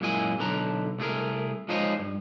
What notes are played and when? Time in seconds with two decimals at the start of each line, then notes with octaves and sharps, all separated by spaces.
0.01 F#2 A#2 G#3 E4 G#5
0.39 B1 D3 B4 A5 A#5
0.99 C2 A3 B3 G#4 A#4
1.69 F3 G#3 D#4 C5 C#5 D#5
1.99 G2